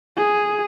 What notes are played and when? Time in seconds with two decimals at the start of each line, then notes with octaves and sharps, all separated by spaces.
0.17 G#4